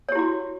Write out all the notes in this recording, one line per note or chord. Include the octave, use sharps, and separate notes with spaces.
E4 F#4 G4 C#5